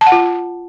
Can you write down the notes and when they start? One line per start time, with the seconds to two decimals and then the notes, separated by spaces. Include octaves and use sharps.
0.01 A5
0.07 F#5
0.12 F4